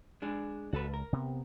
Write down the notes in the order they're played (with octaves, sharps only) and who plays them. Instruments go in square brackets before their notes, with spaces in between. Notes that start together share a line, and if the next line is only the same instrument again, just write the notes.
[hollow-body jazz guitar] G#3 D4 G#4
[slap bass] C#2 [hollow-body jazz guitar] F#4 A4 B4
[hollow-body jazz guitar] A#4
[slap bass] C3 B3